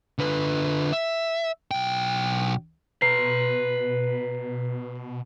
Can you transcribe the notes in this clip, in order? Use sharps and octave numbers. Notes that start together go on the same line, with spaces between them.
D3 B4
E5
B1 G5
B2 B4 A#5 C7